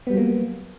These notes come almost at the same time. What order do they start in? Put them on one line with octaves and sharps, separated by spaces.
B3 G3 F#3 A#3